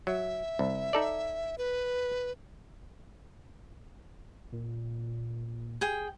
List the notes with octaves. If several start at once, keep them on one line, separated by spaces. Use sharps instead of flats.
F#3 E5
C2
D#4 A4 D5
B4
A#2
G#4 G5